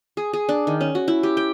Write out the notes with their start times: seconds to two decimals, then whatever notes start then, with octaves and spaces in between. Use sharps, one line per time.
0.17 G#4
0.33 G#4
0.49 D4
0.67 D#3
0.81 C#4
0.95 F#4
1.08 E4
1.23 G4
1.37 G5